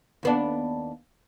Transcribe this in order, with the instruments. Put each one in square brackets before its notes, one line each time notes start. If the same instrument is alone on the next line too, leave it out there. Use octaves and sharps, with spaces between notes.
[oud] D#2 B3 D4